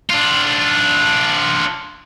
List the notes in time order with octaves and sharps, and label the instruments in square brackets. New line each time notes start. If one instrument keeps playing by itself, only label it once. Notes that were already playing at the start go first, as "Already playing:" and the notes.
[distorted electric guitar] D4 F4